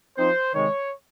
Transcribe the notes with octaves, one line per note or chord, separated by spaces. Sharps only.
F3 C4 D#4 C5
C3 D#3 G#3 C#5